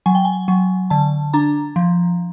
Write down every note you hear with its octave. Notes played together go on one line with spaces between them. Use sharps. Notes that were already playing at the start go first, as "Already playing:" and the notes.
F#3 G#5
G5
G#5
F#3
D3 A5
D4 A#5
F3